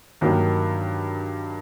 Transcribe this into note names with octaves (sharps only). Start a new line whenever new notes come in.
G2 D#3 F#3 A#3